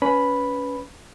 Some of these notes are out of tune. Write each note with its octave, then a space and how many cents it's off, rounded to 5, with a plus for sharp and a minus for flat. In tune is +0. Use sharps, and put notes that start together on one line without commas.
C#4 +25 B4 +0 B5 +0